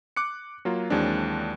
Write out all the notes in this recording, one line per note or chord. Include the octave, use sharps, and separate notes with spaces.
D6 F#6 C#7
F#3 A#3 F4
D#2 E3 F#3 G#3 C4 D4